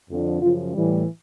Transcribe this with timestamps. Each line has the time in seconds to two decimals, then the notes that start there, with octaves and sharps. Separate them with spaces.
0.10 F2 D3 F3
0.42 F#2 C#3 F3 F4
0.73 A2 E3 G3